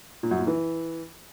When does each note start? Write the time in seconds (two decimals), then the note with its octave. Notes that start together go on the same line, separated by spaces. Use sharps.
0.23 A#2
0.31 F#2
0.39 A#2
0.47 E3